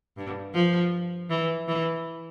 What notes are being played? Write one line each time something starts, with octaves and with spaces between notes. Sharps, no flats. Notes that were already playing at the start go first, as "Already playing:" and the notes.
G2
F3
E3
E3